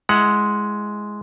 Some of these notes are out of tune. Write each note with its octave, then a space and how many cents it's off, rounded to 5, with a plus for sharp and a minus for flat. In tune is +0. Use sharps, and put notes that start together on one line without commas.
G#3 +5 E4 +0 F#5 +0